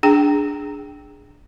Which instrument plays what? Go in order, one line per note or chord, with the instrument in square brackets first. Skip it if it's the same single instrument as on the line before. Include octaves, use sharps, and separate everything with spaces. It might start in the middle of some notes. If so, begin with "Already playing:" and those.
[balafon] D4 G#4 G5